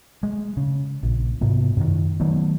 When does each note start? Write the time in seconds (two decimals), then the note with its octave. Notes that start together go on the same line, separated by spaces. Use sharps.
0.23 G#3
0.57 C#3
1.03 A#1
1.41 G#2 C3 B3
1.77 F#2 D#3
2.20 D#3 F#3 A3 B3